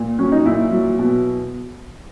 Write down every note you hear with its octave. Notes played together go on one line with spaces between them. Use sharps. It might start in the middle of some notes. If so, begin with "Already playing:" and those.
Already playing: A#2
F#3 C#4
D#4
A#2 E4
F#3
B2